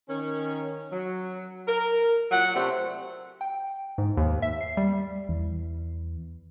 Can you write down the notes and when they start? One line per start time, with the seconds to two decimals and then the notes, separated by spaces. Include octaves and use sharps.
0.09 D#3 C#4
0.92 F#3
1.67 A#4
2.31 A#2 F#3 F#5
2.54 C3 A3 D4 G4 C5
3.41 G5
3.98 G#2
4.17 D#2
4.42 E5
4.61 C7
4.77 G3
5.29 E2